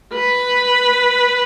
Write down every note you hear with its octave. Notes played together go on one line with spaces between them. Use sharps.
B4